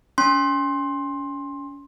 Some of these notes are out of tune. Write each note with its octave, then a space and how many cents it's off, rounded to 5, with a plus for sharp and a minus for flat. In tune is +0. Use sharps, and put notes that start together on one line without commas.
C#4 +40 C6 +15